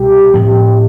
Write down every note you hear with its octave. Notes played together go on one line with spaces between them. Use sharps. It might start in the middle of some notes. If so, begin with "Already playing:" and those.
Already playing: C2 B2 G3 G4
A2 F3 C4